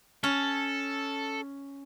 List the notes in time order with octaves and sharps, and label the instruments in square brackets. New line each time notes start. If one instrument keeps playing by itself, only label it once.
[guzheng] C#4 [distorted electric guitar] A4